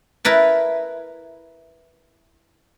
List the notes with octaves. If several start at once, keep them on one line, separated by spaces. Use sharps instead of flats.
E4 A#4 B4 A5